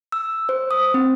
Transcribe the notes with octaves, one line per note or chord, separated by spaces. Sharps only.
E6
C5
D#6
C4